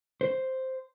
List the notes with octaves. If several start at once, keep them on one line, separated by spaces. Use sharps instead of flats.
C5